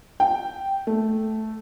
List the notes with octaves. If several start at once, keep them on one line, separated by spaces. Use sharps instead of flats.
G5
A3